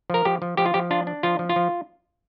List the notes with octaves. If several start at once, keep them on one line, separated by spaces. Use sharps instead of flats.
F3 A#4
F3 G4
F3
F3 G4
F4
F3 G4
D4 F4
D4
F3 F4
F3
F4
F3